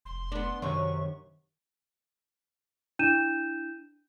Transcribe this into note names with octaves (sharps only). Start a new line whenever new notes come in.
F1 C6
B3 D4
F#2 C3 D#3 C#6
D4 E4 G6 D#7 E7